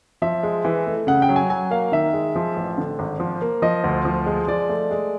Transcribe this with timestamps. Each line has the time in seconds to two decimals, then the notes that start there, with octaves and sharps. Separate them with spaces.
0.22 F3 E5
0.43 G#3
0.65 E3
0.87 A3
1.07 C#3 F#5
1.22 G5
1.29 F#3
1.36 G#5
1.50 F#3 G#5
1.71 A#3 F5
1.92 D#3 E5
2.13 G#3
2.35 F3
2.57 A1
2.78 D3
2.99 G#1
3.20 F3
3.42 A#3
3.62 F3 D#5
3.84 D2
4.05 F3
4.26 G#3
4.47 F3 D5
4.69 A3
4.91 G#3